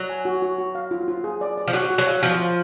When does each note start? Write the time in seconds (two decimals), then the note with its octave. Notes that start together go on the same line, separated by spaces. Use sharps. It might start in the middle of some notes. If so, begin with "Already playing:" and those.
Already playing: F#3
0.10 G#5
0.25 F#4
0.42 F#4
0.58 F#4
0.75 F5
0.91 F4
1.08 F4
1.24 G#4
1.41 D5
1.58 D5
1.68 F3
1.73 F#3 F#4
1.90 F#4
1.98 F#3
2.07 F5
2.23 F3 F#4
2.40 F5